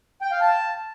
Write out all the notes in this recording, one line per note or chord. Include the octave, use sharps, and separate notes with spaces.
G5
F5
A5